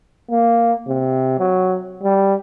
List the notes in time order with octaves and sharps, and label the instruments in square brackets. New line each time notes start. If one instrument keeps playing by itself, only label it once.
[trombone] A#3
C3
F#3
G3